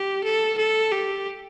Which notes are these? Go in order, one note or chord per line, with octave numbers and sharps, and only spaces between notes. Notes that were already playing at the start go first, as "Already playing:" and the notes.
Already playing: G4
A4
A4
G4